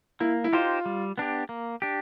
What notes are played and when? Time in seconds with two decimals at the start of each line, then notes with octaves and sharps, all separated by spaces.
0.20 A#3 E4
0.44 E4
0.53 D#4 F4 G4 C5
0.86 G3
1.18 B3 D4 G4
1.49 A#3
1.82 D4 G4